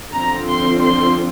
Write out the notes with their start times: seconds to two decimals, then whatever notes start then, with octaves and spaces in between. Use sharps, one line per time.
0.13 D3 F3 C4 A#5
0.49 C6
0.84 C6